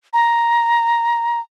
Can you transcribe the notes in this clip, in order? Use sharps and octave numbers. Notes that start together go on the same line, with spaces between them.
A#5